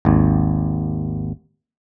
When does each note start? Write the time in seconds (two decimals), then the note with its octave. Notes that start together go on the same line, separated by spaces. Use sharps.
0.05 G#1 D#2